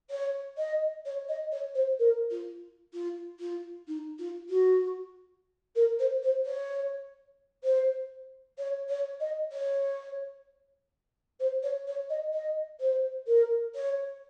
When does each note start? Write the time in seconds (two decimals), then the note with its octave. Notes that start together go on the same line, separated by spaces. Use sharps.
0.10 C#5
0.58 D#5
1.05 C#5
1.28 D#5
1.51 C#5
1.75 C5
1.99 A#4
2.30 F4
2.93 F4
3.39 F4
3.87 D#4
4.18 F4
4.49 F#4
5.76 A#4
5.99 C5
6.23 C5
6.45 C#5
7.63 C5
8.58 C#5
8.89 C#5
9.20 D#5
9.52 C#5
11.40 C5
11.62 C#5
11.87 C#5
12.09 D#5
12.33 D#5
12.80 C5
13.27 A#4
13.75 C#5